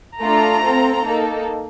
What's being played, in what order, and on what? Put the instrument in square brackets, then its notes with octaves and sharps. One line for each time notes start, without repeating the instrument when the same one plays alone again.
[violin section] A3 D4 F4 A4 A#5
C4 F4 A4
A#3 D#4 A4